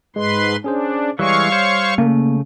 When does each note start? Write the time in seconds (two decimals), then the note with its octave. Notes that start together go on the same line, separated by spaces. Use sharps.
0.16 G#2 G#3 B4 C6
0.64 C#4 D4 G#4 C5
1.19 E3 G3 G#3 C#5 F5 C#6 E6
1.52 C5
1.98 C#3 A3 A#3